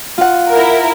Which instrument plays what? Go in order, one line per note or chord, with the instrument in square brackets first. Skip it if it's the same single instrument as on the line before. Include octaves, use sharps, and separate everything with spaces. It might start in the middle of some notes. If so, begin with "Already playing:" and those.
[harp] F4 F#5
[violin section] E4 A#4